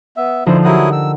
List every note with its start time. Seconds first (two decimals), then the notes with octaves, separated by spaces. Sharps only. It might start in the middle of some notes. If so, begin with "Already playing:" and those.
0.17 B3 E5
0.46 D3 F3 D#4 E4 C5
0.64 F#3 E4 G4 A#4 F#5 D#6
0.92 E6